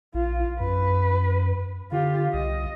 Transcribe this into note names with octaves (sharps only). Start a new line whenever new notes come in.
A#1 F4
F#2 B4
D3 F4 G4
C2 D#5